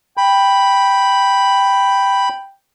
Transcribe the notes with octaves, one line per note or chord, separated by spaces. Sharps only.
G5 B5